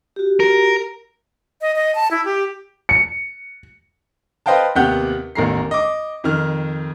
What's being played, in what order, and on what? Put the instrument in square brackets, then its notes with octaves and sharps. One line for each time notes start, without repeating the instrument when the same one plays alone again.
[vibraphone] F#4 G4
[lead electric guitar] A#4
[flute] D#5
D#5
A5
E4
G4
[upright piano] C#7
[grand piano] B4 C5 D#5 F5 G5 A5
D#2 C3 B3 G4 F#5 G6
A1 E2 D#3 A#3 A#5 C7
D#5 D6
F2 D#3 F6